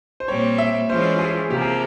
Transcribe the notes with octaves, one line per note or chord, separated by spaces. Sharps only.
C5
A#2 G3 C4 C#5
E5
E3 G#3 C#4 F4 C5
G#4
C3 F3 A#3 E4 G4
G#4